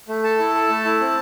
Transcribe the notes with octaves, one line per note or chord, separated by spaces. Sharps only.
A3
A4 A5
E4
A4
A3
E4
C4